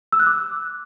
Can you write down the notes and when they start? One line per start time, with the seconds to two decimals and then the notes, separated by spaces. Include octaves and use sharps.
0.12 E6
0.20 F#6
0.27 D6